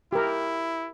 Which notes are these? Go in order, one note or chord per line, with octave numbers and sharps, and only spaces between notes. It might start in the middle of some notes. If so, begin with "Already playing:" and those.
E4 G4 A#4